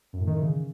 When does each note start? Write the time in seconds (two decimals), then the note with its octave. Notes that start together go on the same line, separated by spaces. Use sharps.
0.13 F#2
0.20 A2
0.27 D#3
0.34 E3
0.41 C#3